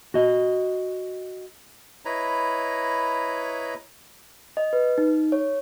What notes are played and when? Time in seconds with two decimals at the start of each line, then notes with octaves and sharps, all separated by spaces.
0.14 F#4 D#5
2.05 E4 B4 C#5 D#5 A#5 B5
4.57 D#5
4.73 B4
4.98 D#4
5.32 C#5